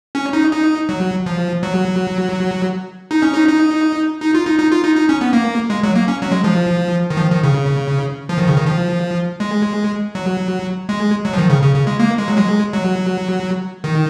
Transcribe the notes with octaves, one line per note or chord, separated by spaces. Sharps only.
C#4
D#4
D#4
F#3
F3
F#3
D#4
C#4
D#4
D#4
D#4
F4
D#4
D#4
F4
D#4
D#4
C#4
B3
A#3
G#3
F#3
A#3
C#4
F#3
G#3
F3
D#3
F3
D#3
C#3
F3
D#3
C#3
D#3
F3
G#3
F#3
G#3
F#3
F3
D#3
C#3
C#3
C#3
G#3
A#3
G#3
F#3
G#3
F#3
D#3